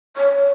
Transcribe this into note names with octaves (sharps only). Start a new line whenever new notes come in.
C#5